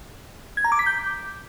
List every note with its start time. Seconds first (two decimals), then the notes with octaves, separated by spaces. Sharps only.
0.57 G#6
0.64 A#5
0.72 D6
0.79 B6
0.86 G6